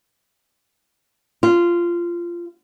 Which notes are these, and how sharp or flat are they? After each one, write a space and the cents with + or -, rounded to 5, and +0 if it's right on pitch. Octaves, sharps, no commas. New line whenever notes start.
F4 -15